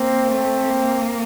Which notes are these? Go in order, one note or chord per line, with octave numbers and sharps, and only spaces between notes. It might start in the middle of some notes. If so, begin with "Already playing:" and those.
Already playing: A#3 C4
A3 C4
A#3